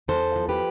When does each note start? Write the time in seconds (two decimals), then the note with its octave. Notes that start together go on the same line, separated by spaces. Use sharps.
0.08 E2 A4 C5
0.36 F3
0.49 G4 B4